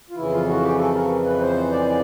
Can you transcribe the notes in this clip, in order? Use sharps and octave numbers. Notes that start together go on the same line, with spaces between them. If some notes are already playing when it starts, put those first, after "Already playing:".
F4
F2 C#3 E3 E4
F4
F#4
G4
A4
A#4
B4
C5
D5